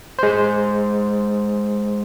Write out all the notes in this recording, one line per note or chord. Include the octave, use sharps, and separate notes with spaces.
G#3 C5